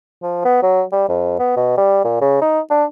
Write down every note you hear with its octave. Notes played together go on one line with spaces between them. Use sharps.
F3
B3
F#3
G3
F2
B3
B2
G3
A#2
C#3
D#4
D4